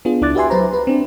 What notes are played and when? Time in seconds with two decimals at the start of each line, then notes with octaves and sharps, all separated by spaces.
0.05 B3 D4 F4 G#4
0.21 C#2 D4 E4 D6 F#6 A6
0.35 F#4 G4 B4 E5 G#5 C6
0.50 F#3 B4 C5 A#5
0.73 B4
0.87 C4 D4